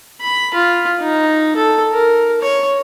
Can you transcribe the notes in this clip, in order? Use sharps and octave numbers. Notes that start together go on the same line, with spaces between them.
B5
F4
D#4
A4
A#4
C#5